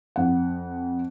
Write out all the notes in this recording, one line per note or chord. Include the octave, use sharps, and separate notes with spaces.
F2 F#5